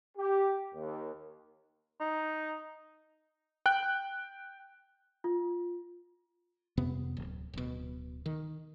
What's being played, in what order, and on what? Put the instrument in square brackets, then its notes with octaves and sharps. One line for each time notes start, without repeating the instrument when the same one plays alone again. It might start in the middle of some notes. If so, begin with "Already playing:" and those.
[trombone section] G4
D#2
[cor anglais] D#4
[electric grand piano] G5 F#6
[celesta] F4
[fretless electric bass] D#1 F2 C3 B3
D1
D1 B2
D#3